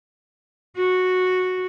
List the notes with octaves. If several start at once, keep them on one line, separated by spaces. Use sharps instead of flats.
F#4